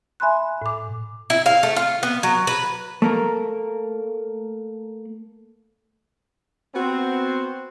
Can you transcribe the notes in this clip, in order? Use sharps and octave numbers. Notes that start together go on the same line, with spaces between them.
E5 G#5 B5 C6 F#6
A2 D6
E4
F5
A3
F4
B3
F#3
B4
A3 A#3 A#4
B3 C4 F#4 C5